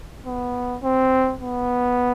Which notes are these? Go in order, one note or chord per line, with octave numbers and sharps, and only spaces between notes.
B3
C4
B3